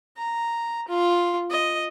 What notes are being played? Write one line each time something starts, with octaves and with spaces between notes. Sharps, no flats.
A#5
F4
D#5